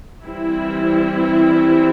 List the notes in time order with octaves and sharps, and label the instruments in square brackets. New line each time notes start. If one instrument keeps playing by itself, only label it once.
[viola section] E3 G3 C4 E4